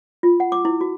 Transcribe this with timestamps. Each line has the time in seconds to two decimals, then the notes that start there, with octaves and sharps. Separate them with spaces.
0.23 F4
0.40 F#5
0.52 D6
0.65 E4
0.81 F#4